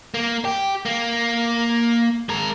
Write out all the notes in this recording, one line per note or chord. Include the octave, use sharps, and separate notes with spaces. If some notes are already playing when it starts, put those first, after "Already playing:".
A#3
G4
A#3
G#3 A#4